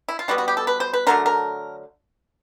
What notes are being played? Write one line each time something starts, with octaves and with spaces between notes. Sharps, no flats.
E4
F4
B2 G3 B3 F#4
F#4
G4
A4
B4
C5
B4
D3 F#3 A3 A#4
A#4